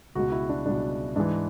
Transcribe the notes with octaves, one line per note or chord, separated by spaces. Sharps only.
C#2 B2 F#4
E4
D4
C#2 B2 D4
G#2 E3 D4